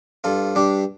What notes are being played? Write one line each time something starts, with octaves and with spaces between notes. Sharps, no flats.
G2 F4 A4
G2 D4 G4